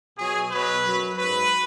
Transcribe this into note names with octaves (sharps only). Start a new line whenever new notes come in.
B2 F#3 G#4
B2 F#3 B4
F#2 F#3
G#2 F#3 B4